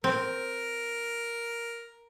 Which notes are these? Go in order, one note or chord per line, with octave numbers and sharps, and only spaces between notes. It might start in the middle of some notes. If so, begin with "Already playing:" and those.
C4 A#4